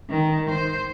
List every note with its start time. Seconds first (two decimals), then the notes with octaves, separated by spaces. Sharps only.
0.10 D#3
0.50 C5